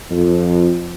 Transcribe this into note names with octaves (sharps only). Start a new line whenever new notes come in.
F2